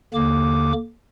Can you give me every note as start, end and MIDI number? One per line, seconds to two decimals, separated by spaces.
0.14 0.73 39
0.14 0.73 50
0.14 0.73 58
0.14 0.73 86